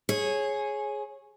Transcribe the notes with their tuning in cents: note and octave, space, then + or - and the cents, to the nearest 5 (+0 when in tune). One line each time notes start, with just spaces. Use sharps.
G#4 +10 C#5 -15